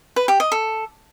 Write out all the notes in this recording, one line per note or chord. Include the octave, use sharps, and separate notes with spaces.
B4
G4
D#5
A4